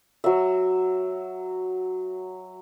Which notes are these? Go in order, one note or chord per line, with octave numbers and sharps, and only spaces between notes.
F#3 E5